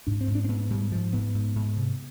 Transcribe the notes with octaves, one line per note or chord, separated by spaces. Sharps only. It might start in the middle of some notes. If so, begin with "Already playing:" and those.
G#2 D4
C4
G#2
D4
C4
G#2 B3
G#2 G3
G#2 F3
G#2 B3
G#2
G#2
C3